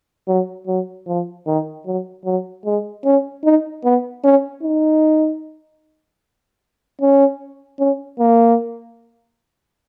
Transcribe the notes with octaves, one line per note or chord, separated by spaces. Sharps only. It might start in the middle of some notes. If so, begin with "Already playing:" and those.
F#3
F#3
F3
D#3
F#3
F#3
G#3
C#4
D#4
B3
C#4
D#4
C#4
C#4
A#3